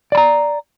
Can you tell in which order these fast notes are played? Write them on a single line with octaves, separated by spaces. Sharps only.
D5 B5 A#5